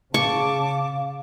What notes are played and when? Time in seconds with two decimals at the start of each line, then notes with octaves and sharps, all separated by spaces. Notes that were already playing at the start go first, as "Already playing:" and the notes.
0.14 C#3 F5 A5 C#6 D6